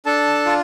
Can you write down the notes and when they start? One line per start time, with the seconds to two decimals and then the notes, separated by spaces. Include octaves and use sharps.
0.06 D4 A4 A5
0.46 F4